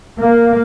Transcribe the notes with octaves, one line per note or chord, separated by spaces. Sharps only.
A#3